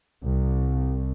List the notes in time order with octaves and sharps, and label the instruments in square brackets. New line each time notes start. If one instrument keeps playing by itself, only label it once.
[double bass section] C2